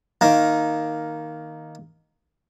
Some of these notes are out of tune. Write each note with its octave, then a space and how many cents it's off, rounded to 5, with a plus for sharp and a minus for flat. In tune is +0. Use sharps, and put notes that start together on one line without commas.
D#3 +0 A#3 +0